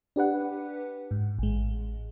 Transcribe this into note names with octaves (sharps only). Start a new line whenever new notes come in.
D4 G4 B4 F#5
G#2
A1 G#3